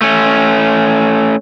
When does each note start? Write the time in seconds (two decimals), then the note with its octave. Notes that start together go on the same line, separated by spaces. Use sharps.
0.02 A3 C#4